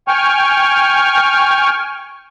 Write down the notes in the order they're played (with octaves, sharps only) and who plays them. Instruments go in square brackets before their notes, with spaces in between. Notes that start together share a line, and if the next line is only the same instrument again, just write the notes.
[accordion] G5 G#5 C#6 F6